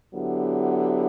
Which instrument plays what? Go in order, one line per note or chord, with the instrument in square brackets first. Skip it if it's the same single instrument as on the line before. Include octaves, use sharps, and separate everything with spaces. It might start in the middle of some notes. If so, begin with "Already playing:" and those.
[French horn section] D3 F#3 B3 E4 G4